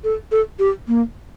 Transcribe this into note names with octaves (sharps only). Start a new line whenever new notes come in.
A4
A4
G4
A#3